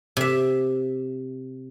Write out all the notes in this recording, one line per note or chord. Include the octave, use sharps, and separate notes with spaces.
C3 E5